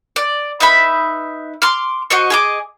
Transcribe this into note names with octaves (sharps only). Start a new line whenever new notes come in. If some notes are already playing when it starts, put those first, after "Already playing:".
D5
D#4 B4 E5 B5
C6 D6 F6
F#4 C5 D#5 C#6
G#4 D#5 D6